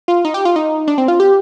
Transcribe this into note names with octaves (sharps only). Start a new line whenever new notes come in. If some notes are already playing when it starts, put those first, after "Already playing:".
F4
D#4
G4
F4
D#4
D4
C4
F4
G4